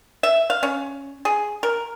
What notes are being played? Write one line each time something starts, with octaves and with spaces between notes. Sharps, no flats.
E5
F5
C#4
G#4
A#4